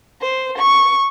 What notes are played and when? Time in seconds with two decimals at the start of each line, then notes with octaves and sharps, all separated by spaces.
0.22 C5
0.58 C#6